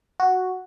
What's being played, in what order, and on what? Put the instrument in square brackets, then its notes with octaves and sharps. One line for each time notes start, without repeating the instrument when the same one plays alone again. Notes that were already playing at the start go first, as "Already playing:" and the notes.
[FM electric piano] F#4